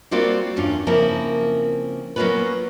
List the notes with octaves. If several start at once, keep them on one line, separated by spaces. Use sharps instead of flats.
G3 A#3 C4 F4 F#4 D5
E2 G2 C#4 F4
C#3 F3 A#3 C4 E4 A#4
F#3 A#3 B3 C#4 F4 B4